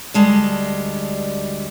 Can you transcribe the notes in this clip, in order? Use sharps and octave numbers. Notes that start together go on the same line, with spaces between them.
D2 G3 G#3 A5